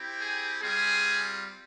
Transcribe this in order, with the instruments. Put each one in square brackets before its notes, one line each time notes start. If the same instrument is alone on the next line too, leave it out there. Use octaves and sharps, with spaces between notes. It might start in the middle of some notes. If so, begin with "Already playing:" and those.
Already playing: [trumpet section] C4 E4 G4
G#4
G3 C4 F4 G#4